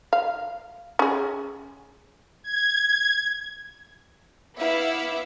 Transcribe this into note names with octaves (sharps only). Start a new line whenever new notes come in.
F5
C#4 G#4
G#6
B3 E4 E5 F5 D6